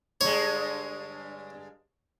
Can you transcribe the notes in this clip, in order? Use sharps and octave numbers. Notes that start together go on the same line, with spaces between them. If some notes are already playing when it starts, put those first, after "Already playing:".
G2 D3 G#3 C#5